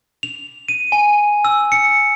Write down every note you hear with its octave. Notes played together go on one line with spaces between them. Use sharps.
F7
D#7
G#5
E6
C#7